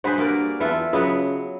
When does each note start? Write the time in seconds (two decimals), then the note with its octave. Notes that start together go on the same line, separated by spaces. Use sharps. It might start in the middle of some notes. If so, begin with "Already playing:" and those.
0.04 G2 F#4 G#4 C5 F#5 B5
0.18 A#3 A#4 D5
0.60 E2 E4 F4 A4 B4 E5
0.93 C#3 F#3 B3 F4 B4 D#5